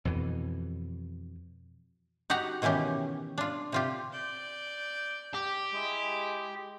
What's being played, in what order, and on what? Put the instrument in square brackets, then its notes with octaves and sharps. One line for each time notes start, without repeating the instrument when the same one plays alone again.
[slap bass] F2 B2 E3
[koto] D#4 F#4 G4 F#5 A#5
B2 D#3 E3 C#4 G4
D4 F4
C3 F4 G4
[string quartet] D5 G6
[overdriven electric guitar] G4
[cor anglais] G#3 [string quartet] E4